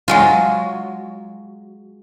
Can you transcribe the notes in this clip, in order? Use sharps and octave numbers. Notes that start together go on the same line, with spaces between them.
F#3 G#3 F4